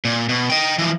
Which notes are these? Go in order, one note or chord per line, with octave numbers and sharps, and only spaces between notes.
A#2
B2
D#5 G5
E3 F3